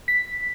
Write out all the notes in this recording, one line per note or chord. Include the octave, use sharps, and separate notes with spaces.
B6